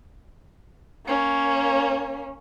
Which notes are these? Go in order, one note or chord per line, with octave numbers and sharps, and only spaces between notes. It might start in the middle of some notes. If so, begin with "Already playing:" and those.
A#3 C#4